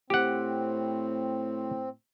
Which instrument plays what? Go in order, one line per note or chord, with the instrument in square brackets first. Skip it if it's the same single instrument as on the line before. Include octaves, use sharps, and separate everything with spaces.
[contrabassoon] A2 [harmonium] C4 [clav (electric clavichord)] G4 F#5